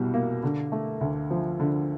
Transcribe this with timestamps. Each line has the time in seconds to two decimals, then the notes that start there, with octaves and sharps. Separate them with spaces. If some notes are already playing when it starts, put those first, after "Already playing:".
Already playing: C2 B2 G3
0.14 A#3
0.43 D3
0.72 A3
1.01 D2
1.31 F3
1.60 D3